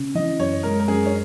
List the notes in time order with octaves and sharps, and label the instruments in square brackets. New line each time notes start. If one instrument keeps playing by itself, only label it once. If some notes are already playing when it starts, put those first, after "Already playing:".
Already playing: [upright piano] C#3
[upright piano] E3 [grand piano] D#5
[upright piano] F#2 [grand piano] C#5
[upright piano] G#3 [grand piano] A#4
[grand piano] A#4
[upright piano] F#2 [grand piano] G#4
[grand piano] C#4